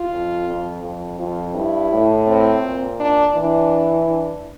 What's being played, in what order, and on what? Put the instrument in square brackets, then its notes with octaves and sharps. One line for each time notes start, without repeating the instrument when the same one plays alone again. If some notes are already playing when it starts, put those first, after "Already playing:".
Already playing: [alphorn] F4
[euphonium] F2
F2
F2
[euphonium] F2 [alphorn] F4
[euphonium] G2 [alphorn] E4
[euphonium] A2
[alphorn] C4
[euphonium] A#2
[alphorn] D4
[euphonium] E3 [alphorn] D4
[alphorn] D4